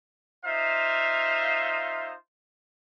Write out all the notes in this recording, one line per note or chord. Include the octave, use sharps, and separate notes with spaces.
D#4 F4 C5 E5 F5